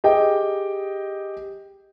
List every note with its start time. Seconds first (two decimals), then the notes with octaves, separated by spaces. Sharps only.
0.04 G4 G#4 D#5 G5